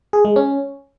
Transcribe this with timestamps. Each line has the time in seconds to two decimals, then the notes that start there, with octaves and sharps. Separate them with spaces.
0.13 G#4
0.25 G#3
0.36 C#4